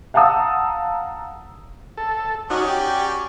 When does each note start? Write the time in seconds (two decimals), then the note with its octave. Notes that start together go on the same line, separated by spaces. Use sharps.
0.14 F5 F#5 A5 A#5 D#6 E6
1.97 A4
2.50 F#3 C#4 D#4 F#4 D5
2.68 G4